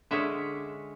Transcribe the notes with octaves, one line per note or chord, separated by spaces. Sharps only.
D3 G#3 C#4 E5